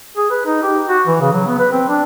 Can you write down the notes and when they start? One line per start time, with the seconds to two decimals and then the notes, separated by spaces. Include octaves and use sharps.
0.17 G#4
0.30 B4
0.46 D#4
0.63 G4
0.88 F#4
1.07 E3
1.21 C#3
1.33 F#3
1.47 B3
1.59 B4
1.72 C4
1.88 D4